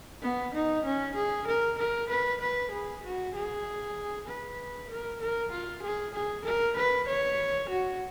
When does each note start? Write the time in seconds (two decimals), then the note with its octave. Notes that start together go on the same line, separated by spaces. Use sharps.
0.22 B3
0.54 D#4
0.85 C#4
1.15 G#4
1.47 A#4
1.78 A#4
2.09 B4
2.41 B4
2.71 G#4
3.03 F#4
3.34 G#4
4.28 B4
4.90 A#4
5.20 A#4
5.51 F4
5.82 G#4
6.14 G#4
6.44 A#4
6.77 B4
7.08 C#5
7.69 F#4